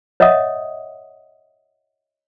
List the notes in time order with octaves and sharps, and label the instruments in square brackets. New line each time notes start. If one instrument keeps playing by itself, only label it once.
[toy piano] C#5 D#5 E5 F#5 D#6